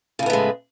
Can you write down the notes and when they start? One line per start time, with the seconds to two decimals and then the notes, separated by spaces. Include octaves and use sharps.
0.19 C#3
0.23 A2
0.26 B3
0.30 A3
0.33 G#3